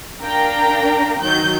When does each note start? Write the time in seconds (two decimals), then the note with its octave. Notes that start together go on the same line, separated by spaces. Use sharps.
0.23 D4 A#4 F5 G5 A#5
1.21 D#3 F#3 G6